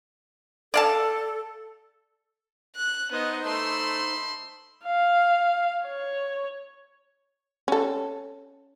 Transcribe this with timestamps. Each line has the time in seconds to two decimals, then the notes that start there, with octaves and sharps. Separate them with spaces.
0.74 A4 D5 F5 A5
2.76 F#6
3.12 B3 D#4 C5 D#5
3.46 A3 B5 C6 E6
4.85 F5
5.84 C#5
7.68 C#4 A4